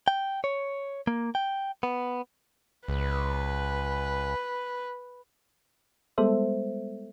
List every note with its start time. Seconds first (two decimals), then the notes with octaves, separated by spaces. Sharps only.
0.08 G5
0.44 C#5
1.07 A#3
1.35 G5
1.83 B3
2.88 C#2 B4
6.18 G3 G#3 B3 A4 C5 E5